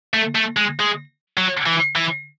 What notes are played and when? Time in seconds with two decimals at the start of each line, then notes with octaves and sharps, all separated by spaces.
0.14 A3
0.35 A3
0.57 G#3
0.80 G#3
1.37 F#3
1.66 E3
1.96 E3